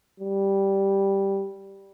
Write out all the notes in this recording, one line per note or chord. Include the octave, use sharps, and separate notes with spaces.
G3